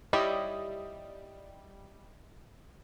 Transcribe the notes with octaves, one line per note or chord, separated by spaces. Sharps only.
G3 E4 G4 C#5 D#5